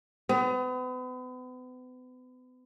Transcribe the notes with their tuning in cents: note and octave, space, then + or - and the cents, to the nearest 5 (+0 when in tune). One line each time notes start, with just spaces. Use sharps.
B3 +40